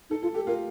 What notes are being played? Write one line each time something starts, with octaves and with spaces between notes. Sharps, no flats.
D#4 A4
F4 A4
G4 A4
F4 A#4